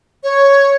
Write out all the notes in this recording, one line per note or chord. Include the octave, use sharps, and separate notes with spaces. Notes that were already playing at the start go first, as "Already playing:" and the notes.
C#5